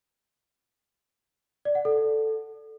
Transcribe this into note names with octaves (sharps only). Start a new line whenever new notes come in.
D5
F#5
A4